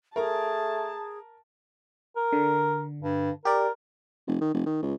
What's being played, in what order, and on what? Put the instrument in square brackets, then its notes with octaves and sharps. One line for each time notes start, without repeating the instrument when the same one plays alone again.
[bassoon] A3 [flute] G#4 [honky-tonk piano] A#4 A#5 [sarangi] A5
[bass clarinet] A#4
[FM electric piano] D3
[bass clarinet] G2
[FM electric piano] G4 D5 [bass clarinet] A#4
[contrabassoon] F1
D#3
F1
D#3
C#2